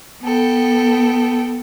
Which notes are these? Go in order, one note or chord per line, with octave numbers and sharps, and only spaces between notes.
B3 A4 G5